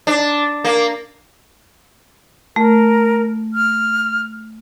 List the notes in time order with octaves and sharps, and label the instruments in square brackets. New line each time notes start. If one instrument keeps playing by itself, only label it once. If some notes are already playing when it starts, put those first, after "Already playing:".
[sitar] D4
A#3
[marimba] A3 [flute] A#4
[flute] F6